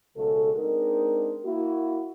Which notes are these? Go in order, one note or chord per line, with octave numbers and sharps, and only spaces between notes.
B1 C#3 G#3 F#4 A4
G#3 C4 D4 D#4 A#4
A#3 E4 F#4